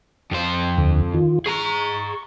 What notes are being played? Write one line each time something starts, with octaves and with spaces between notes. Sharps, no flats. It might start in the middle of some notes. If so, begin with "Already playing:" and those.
F2 C5
D#2 D3
D#3 F4
G#4 A#5 C#6